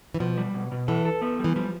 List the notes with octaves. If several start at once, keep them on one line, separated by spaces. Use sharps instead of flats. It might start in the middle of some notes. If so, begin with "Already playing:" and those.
E3
B2 F3
G3
B2
B2
E3 A4
A4
B3
G3
E3
F3 G3